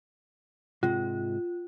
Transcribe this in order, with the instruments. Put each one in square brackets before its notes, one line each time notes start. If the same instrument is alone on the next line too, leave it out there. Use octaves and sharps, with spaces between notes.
[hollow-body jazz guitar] G#2 C3 G#3 [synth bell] F4